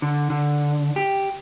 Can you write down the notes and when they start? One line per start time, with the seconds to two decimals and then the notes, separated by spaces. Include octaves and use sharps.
0.02 D3
0.30 D3
0.96 G4